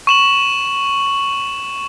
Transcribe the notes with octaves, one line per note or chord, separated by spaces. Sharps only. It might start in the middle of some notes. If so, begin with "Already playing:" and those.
C#6 E7 F#7